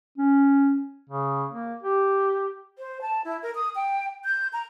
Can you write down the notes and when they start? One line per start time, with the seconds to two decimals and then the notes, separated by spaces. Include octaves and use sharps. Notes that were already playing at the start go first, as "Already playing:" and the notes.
0.18 C#4
1.09 C#3
1.51 A#3
1.83 G4
2.78 C5
3.02 A5
3.25 E4
3.43 A#4
3.55 D#6
3.76 G5
4.25 G6
4.53 A#5